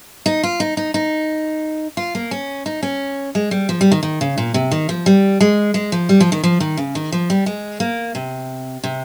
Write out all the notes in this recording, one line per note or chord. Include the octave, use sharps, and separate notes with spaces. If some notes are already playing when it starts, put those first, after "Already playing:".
D#4
F4
D#4
D#4
D#4
F4
A#3
C#4
D#4
C#4
G#3
G3
F3
G3
D#3
D#3
C#3
A#2
C3
D#3
F3
G3
G#3
G#3
F3
G3
F3
D#3
F3
D#3
C#3
D#3
F3
G3
G#3
A#3
C3
C3